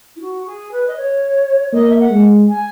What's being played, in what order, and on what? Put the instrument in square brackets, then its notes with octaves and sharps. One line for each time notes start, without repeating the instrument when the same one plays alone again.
[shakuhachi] E4
F#4
G#4
B4
D#5
C#5
[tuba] A#3 [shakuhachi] D#5
[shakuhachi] E5
F#5
[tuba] G#3
[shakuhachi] G#5